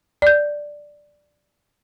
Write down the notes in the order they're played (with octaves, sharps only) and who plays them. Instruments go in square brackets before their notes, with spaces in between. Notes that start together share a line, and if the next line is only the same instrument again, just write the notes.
[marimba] D5 G6